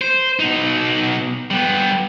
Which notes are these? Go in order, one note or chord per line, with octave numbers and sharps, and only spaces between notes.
C5
B2 D#4
G3 B3